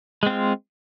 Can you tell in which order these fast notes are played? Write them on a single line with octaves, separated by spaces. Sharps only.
G#3 C4 F4